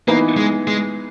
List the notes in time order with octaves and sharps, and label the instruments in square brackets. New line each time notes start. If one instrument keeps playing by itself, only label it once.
[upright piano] E3 B3 D#4 [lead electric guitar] A#3
[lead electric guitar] G#3
G#3